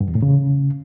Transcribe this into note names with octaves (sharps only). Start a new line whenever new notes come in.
G2
E2
A2
C#3